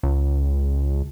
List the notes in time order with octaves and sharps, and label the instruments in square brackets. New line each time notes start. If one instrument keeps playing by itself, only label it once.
[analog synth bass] C#2